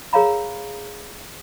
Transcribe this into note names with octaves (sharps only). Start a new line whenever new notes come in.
G#4 A#4 C#5 F5 A#5 B5